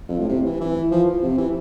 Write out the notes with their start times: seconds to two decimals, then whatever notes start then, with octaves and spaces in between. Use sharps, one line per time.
0.08 F2
0.19 A2
0.29 C3
0.46 E3
0.61 E3
0.91 F3
1.22 C3
1.38 E3